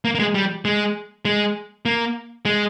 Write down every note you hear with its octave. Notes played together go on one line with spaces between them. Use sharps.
A#3
A#3
G#3
G3
G#3
G#3
A#3
G#3